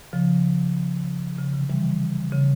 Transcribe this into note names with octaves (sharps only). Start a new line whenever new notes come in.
C#3 F3
C#3
C3 E3
E3 G3
C#3